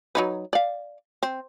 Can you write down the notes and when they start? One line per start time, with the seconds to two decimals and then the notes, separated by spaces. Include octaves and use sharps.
0.15 F#3 D#4 B4
0.53 D5 F5
1.23 C4